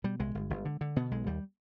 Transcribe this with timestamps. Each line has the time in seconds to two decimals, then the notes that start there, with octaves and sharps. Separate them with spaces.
0.04 B2 G3
0.20 C2 G#3
0.35 G1
0.50 G1
0.65 D3
0.81 D3
0.96 B2 B3
1.11 B1 G#3
1.27 D#2 G3